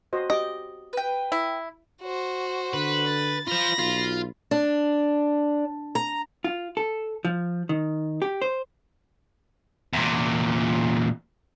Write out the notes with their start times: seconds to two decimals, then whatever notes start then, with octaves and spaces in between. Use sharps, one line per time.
0.13 F#4 C5 D#5
0.30 G4 D#5 D6
0.93 B4 G5
1.32 E4
2.02 F#4 C5
2.74 D3 B4
3.06 A6
3.48 F4 C5 B5 A#6
3.79 B1 F4
4.51 D4
5.95 A#5
6.44 F4
6.77 A4
7.25 F3
7.69 D#3
8.22 G4
8.42 C5
9.93 E2 A#2